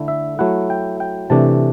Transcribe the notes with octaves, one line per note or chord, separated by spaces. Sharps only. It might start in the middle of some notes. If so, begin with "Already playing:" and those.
Already playing: D3 A3 E4
E5
F#3 A3 E4 F#5
G5
G5
C3 E3 A3 D4 A5